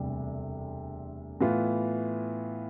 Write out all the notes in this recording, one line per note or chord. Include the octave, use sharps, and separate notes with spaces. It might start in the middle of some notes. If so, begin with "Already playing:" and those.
Already playing: E1 D2 C3 G3
A2 E3 B3 F4